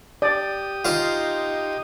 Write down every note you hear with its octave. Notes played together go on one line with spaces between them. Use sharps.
G4 D5 D#6
D#4 F4 C5